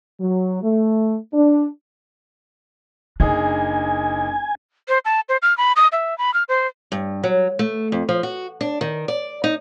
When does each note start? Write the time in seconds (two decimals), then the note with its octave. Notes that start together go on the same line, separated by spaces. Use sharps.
0.20 F#3
0.63 A3
1.34 D4
3.20 F#1 D4 D#4 G#4 G#5
4.89 C5
5.05 A5
5.29 C5
5.42 F6
5.58 B5
5.76 D#6
5.92 E5
6.18 B5
6.34 F6
6.49 C5
6.92 G2
7.24 F#3
7.59 A3
7.92 F2
8.09 F3
8.23 F#4
8.61 D4
8.81 D#3
9.08 D5
9.44 D#4